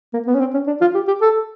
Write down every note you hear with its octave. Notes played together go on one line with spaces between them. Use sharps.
A#3
B3
C#4
C4
C#4
D4
F4
G4
G4
A4